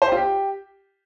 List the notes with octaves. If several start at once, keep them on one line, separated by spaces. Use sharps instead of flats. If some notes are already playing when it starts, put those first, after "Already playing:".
C5
G4
F4
G4